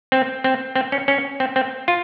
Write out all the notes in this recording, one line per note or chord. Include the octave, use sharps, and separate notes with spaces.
C4
C4
C4
C#4
C#4
C4
C4
F4